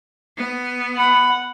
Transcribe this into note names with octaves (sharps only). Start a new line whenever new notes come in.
B3
F#5 B5